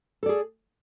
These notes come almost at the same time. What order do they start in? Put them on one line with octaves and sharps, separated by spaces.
A4 D5 G#4